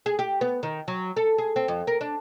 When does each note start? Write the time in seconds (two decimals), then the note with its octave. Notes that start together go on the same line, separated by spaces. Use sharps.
0.06 G#4
0.19 G4
0.41 B3
0.63 D#3
0.88 F#3
1.16 A4
1.38 G#4
1.56 C4
1.68 F2
1.87 A#4
2.01 D4